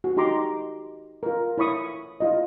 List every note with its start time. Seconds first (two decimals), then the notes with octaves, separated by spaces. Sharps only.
0.04 F#4
0.17 D#4 G4 A#5 C6 D6
1.23 F4 A#4
1.58 E4 C#5 B5 C#6 D#6
2.20 E4 F4 D#5